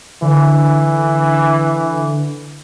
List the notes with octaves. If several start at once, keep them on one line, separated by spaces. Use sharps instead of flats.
D3 E3